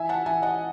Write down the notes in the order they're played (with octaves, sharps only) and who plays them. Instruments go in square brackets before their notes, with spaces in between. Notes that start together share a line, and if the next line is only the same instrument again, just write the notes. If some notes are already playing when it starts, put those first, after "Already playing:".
Already playing: [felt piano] E3 E5 G#5
F#5 A5
E3 E5 G#5
D#5 F#5